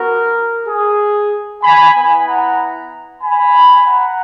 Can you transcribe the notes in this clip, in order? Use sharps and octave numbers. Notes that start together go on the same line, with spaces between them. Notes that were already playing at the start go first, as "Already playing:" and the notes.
Already playing: B3 F#4 A#4
G#4
G#5 B5
B3 E4 G#5 B5
F#5 A#5
G#5 B5
F#5 A#5